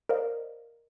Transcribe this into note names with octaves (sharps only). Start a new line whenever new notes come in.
A#4 C5 D5 D#5 F5